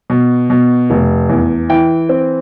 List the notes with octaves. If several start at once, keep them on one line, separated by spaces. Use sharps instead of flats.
B2
B2
F1
E2
E3 G5
C4